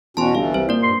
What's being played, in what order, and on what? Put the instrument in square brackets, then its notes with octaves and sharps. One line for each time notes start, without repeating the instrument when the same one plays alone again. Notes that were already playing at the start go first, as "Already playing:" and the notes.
[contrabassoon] E2 [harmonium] B2 C#4 F#4 [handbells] A5 C6
[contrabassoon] G1 [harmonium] E3 G3 [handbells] F5
[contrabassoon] C2 [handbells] C5
[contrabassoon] A#2 [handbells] A#3 D5
[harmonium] G2 [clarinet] C6